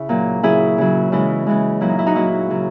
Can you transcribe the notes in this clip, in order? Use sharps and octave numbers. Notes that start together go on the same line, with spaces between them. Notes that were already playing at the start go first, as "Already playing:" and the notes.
Already playing: C#3 E4
A#2 F#3
C#3 F#3 E4 G#4
C#3 F#3
C#3 E3 G#3 E4
C#3 E3 G#3
A#2 F#3 E4
D#4
E4
D#4 F#4
A#2 F#3 E4
C#3 F#3